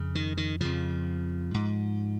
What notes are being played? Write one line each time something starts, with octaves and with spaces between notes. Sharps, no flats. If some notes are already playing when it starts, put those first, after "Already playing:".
Already playing: F2 C#3
D#3
D#3
F2 C#3 F3
G#2